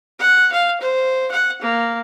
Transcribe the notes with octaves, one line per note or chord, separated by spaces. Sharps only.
F#5
F5
C5
F#5
A#3